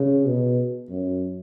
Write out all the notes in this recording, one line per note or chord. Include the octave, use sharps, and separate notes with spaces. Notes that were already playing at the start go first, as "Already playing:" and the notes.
Already playing: C#3
B2
F#2